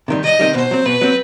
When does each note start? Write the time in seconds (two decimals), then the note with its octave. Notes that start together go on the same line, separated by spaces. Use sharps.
0.08 C3 D#3 G3
0.24 C2 D#5
0.39 C3 D#3 G3
0.55 B2 C5
0.71 F#3 C4
0.86 B2 B4
1.01 F#3 C4